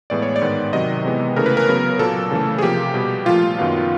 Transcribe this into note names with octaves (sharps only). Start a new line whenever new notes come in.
A2 E3 G#3 B3 D5
C#5
D5
G#2 D#3 G#3 B3
C3 D#3 F#3 D#5
C3 E3 G#3 B3
C#3 E3 A3 A#4
B4
A#4
C#3 F#3 B3
A#2 F#3 A#3 A4
C#3 E3 A3
G#4
C3 F3 A#3 G4
B2 G3 B3
A#2 F3 A3 F4
F#2 D#3 F#3 B3